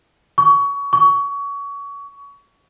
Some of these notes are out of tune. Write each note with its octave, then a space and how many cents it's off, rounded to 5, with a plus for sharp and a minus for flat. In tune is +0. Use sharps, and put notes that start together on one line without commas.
C#6 +25
C#6 +25